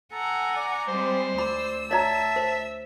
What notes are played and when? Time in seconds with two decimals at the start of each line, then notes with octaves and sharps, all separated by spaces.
0.12 A4 F#5 G#5 A#5
0.57 D5
0.88 G3 G#3 C4 C5
1.38 D2 D5 B5 E6
1.91 C#5 D5 E5 A5 A#5
2.36 C5